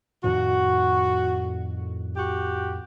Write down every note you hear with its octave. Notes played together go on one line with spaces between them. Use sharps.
F2 A2 D#3 F#4
F#4 G4